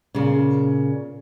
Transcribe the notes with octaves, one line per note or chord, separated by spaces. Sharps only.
A#2 C#3